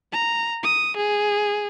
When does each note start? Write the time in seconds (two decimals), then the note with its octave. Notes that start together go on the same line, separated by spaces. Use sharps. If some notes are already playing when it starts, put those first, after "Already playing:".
0.12 A#5
0.63 D#6
0.97 G#4